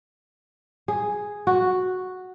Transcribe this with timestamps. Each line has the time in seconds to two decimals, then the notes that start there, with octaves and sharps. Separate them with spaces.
0.88 G#4
1.47 F#4